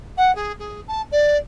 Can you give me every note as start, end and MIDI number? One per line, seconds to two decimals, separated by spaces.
0.17 0.34 78
0.35 0.52 68
0.59 0.80 68
0.87 1.02 81
1.11 1.36 74